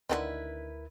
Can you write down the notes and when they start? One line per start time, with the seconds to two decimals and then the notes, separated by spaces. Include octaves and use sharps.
0.09 D2 D3 D#3 D#4 E4 F#4 A#4 B4